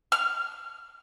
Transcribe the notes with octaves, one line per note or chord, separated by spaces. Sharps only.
F6